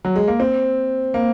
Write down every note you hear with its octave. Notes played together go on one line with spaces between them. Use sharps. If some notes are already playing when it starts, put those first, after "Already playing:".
F#3
G#3
A#3
C4
A#3